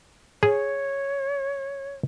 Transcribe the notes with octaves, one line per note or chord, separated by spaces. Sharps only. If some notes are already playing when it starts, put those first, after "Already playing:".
G#4 C#5